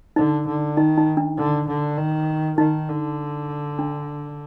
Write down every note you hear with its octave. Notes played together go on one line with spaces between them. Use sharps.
D3 D#4
D3
D#3 D#4
D#4
D4
D3
D3
D#3
D#3 D#4
D3
D4